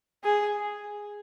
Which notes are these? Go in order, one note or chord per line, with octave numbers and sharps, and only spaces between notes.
G#4